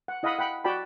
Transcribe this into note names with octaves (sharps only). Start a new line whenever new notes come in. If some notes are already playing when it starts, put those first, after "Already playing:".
F#5
E4 D#5 F5 F#5 B5 D#6
F#5 G5 B5
F#4 D5 G5 A5 B5